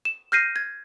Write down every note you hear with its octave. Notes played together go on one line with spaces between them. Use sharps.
E7
F6 G6 A#6 C7 D#7
G#6